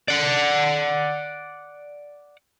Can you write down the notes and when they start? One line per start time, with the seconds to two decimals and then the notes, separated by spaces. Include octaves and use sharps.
0.08 D5 F#5